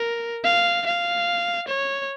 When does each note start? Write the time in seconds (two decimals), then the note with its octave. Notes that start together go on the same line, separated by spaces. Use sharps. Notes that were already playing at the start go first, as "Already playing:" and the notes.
Already playing: A#4
0.44 F5
0.86 F5
1.68 C#5